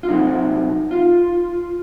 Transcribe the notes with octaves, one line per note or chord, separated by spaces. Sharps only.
F4
C3 F#3 A3 C4 D#4
F4